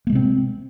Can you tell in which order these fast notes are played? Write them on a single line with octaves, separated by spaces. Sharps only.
A#3 G#3 C3 C4